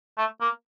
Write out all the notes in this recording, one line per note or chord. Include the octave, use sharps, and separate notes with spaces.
A3
A#3